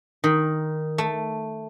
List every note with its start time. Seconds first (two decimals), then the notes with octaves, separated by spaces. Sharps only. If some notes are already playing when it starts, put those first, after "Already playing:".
0.24 D#3
0.98 A3